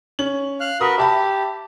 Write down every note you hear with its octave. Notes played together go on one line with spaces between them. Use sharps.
C#4 F#7
F5 F6 F#6
F#4 A#4 B4 D#6
G4 E5 A5 B5